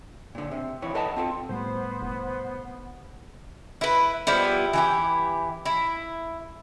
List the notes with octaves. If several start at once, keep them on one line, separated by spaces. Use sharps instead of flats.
A#2 D3
C3
F2 E3 C#5 B5
A4 B4 D#5 F#5 A5
C4 F4 A4
A2 G3 A3 B3 C5
F1
E4 B4
F3 G3 B3 E4
E3 E4 G4
E4